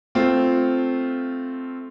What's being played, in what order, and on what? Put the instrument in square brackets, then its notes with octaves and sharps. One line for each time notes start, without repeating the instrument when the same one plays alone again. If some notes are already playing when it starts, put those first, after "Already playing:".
[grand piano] A3 C4 F4